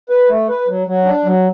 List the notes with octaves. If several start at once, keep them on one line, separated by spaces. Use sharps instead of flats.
B4
A3
B4
F#3
F#3
D4
F#3